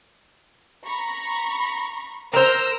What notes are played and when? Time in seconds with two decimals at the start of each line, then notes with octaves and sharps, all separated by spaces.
0.85 A#5 B5 C#6
2.34 A#4 C5 E6 F6 A#6